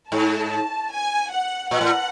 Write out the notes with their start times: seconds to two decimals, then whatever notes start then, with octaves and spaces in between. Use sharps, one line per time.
0.11 G#2 A5
0.91 G#5
1.32 F#5
1.71 A#2 F#5
1.81 A2